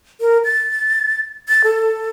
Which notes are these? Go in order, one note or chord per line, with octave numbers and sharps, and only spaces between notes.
A#4
A6
A6
A4